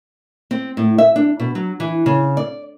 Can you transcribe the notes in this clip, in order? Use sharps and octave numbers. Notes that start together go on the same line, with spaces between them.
C4
A2
E5
D4
B2
F#3
E3
C#3
D5